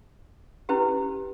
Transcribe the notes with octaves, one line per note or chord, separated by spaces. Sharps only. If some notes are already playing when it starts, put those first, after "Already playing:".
C#4 E4 G4 B4